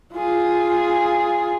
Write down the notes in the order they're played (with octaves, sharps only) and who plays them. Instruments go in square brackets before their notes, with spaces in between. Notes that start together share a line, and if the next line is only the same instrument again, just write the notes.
[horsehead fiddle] F4 G#4